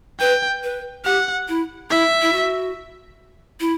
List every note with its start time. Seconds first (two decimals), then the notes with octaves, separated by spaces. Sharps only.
0.20 B4 G5
0.64 B4
1.05 G4 F#5
1.48 E4
1.90 E4 E5
2.22 E4
2.33 F#4
3.60 E4